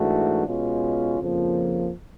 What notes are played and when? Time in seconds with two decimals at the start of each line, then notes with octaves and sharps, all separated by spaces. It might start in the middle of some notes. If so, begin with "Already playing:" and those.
Already playing: G#2 E3 A3 D4 F#4
0.47 B2 G#3 C#4 F4
1.19 F2 C#3 F3 A#3